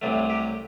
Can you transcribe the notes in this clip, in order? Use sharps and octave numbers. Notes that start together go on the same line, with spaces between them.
C2 C3 F#3 A3
G4